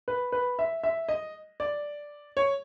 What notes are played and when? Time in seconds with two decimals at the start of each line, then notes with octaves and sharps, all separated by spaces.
0.08 B4
0.32 B4
0.59 E5
0.83 E5
1.09 D#5
1.60 D5
2.37 C#5